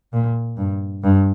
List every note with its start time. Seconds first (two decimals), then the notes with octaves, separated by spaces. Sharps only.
0.13 A#2
0.57 G2
1.03 G2